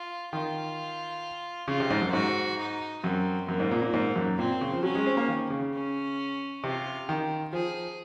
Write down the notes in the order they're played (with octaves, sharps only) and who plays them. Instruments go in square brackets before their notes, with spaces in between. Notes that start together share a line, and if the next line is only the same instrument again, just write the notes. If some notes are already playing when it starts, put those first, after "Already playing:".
Already playing: [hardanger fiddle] F4
[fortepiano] D#3 [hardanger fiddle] F4
[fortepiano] C#3 [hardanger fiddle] F4
[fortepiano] C3
G#2
F#2
[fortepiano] G#2 [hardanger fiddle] F#4
[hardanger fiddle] D#4
[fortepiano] F#2 [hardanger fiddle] C4
[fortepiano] F#2 [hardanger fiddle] A#3
[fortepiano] G#2
A#2
A#2
G#2
F#2
[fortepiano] A#2 [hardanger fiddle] C4
[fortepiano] C#3
F3
[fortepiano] F#3 [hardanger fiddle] C#4
[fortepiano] G#3
C4
A#3
D#3
C#3
[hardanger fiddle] C#4
[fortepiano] C3 [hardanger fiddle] F4
[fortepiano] D#3
[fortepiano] F3 [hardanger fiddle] G#4